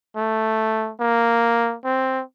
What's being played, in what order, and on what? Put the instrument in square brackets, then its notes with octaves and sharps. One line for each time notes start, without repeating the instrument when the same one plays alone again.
[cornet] A3
A#3
C4